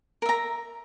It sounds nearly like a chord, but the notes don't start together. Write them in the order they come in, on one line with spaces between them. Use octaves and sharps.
A#4 E5 A#5